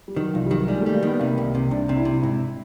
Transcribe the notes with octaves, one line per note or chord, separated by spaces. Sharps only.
G3
D#3 F#3
C2 F3
G3
D#3 F#3
G3 G#3
G3 A3
A#3
D#3 B3
C3 A#3
C2
C3
C2 D4
C3
E4
C3
G#2 E4